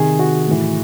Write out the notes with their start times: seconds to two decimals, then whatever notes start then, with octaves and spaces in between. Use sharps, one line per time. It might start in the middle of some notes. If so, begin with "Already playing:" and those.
Already playing: C3 D#3 G#4
0.19 F#4
0.47 A2 E3